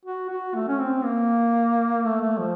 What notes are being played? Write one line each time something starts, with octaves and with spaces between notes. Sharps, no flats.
F#4
F#4
A3
C#4
C4
A#3
A3
A3
F3